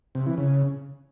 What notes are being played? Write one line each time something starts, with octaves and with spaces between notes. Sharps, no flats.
C3
E3
C#3